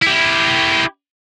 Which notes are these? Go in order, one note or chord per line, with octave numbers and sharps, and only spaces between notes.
E4 G4